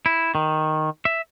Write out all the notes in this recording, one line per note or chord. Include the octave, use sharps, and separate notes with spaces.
E4
D#3
E5